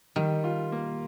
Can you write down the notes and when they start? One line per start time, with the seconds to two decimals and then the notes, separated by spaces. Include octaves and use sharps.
0.16 D#3 G3
0.44 F4
0.72 A#3